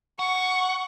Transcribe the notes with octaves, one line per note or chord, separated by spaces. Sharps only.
F#5 C#6